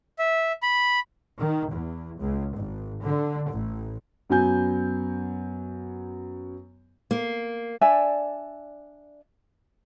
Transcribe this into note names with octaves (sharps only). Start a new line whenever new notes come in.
E5
B5
D#3
E2
C#2
G#1
D3
A1
F#2 F#3 B3 G#5 G6
A#3
D4 D5 E5 G#5